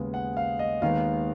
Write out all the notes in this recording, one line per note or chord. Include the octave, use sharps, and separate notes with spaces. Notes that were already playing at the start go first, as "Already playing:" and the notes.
Already playing: D#2 C#3 G#3 B3
F#5
F5
D#5
D#2 D#3 G#3 B3 F5